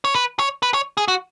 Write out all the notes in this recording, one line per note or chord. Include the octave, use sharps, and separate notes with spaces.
C#5
B4
C#5
B4
C#5
G#4
F#4